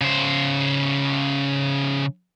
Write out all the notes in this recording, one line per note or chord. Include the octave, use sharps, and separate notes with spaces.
C#3 C5